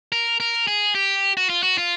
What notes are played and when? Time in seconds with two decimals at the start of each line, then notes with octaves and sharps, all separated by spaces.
0.12 A#4
0.40 A#4
0.67 G#4
0.95 G4
1.37 F#4
1.50 F4
1.63 F#4
1.78 F4